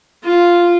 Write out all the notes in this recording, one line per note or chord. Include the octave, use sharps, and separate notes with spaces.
F4